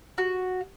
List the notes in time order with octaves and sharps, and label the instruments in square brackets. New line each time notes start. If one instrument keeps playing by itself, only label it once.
[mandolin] F#4